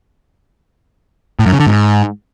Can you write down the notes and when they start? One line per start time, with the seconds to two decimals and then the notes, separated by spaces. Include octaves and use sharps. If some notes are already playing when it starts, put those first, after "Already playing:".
1.39 A2
1.46 F#2
1.53 C#3
1.60 D3
1.66 G#2